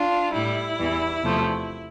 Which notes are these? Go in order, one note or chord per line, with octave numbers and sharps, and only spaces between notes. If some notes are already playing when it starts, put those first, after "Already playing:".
Already playing: D4 F4
A2 G3 E4
E2 E3 G3
E2 C3 F3 A3